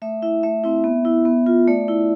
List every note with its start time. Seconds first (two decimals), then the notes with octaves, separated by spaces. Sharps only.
0.02 A3 E5
0.22 E4 E5
0.43 A3 E5
0.64 C4 E4
0.84 B3
1.05 E4
1.25 B3
1.46 F4
1.68 A3 D5
1.88 E4